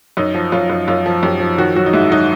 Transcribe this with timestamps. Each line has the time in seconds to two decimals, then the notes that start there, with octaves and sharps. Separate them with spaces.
0.17 F#2 D#4
0.34 F3
0.52 F#2 F4
0.70 F#2
0.87 F#2 F4
1.06 F3
1.22 F#2 G4
1.40 F3
1.58 D#3 F#4
1.76 F#3 F#4
1.86 D#4
1.93 G#2 E4
2.11 F#3 D#4